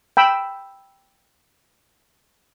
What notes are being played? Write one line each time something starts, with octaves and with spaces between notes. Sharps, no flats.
G5 B5 E6